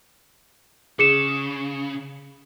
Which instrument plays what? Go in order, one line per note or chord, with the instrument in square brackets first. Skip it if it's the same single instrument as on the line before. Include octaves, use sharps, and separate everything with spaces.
[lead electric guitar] C#3 [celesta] G#4 C#7 E7